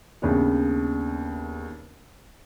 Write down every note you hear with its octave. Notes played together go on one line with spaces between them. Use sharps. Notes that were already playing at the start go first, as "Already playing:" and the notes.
D#2 C#3 B3 C#4 D4